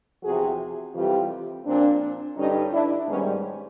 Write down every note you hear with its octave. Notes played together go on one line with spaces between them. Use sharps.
E2 C3 F3 F#4 G#4
F2 C3 E3 G3 F4 G4
A#2 F3 C4 D4
G2 D3 G3 C#4 D#4
D4 E4
G#2 D#3 G3 B3 C#4